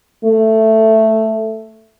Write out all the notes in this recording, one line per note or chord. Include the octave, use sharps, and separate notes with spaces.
A3